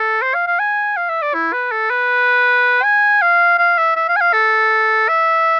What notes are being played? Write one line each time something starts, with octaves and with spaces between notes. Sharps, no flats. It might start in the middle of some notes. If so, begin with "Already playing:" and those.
Already playing: A4
C5
F5
F5
G#5
F5
E5
D5
E4
B4
A4
B4
G#5
F5
F5
E5
E5
F5
G#5
F5
A4
E5